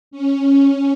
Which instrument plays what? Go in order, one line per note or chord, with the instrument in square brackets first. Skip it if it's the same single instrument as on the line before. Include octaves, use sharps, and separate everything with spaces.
[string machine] C#4